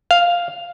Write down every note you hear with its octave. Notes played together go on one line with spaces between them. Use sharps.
F5